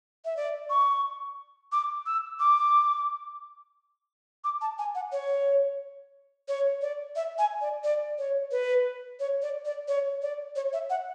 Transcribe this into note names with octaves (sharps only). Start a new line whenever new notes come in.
E5
D5
C#6
D6
E6
D6
D6
A5
G#5
F#5
C#5
C#5
D5
E5
G#5
D5
D5
C#5
B4
C#5
D5
D5
C#5
D5
C#5
E5
F#5